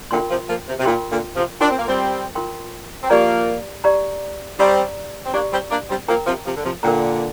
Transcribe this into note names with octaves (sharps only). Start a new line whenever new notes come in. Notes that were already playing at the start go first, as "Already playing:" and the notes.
A#2 D3 F4 A#4 G5 C6
C3 F3
F3 A#3
C3
C3
A#2 F4 A#4 G5 C6
A#2 D3
C3 F3
D4 F4 A#4 G5 C6
C4
A#3
G3 C4
F4 A#4 G5 C6
C4
F3 A#3 G4 D5 A#5
G4 D5 A#5
G3 C4 G4 D5 A#5
C4
A#3 D4 G4 D5 A#5
G3 C4
A#3 D4
G3 C4
F3 A#3 A#4 G5 A#5
C3 F3
C3 F3
D3
C3 F3
A#2 D3 A#4 G5 A#5